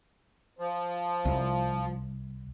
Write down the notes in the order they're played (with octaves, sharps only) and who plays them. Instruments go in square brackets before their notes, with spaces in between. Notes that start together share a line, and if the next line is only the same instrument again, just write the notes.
[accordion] F3
[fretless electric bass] C2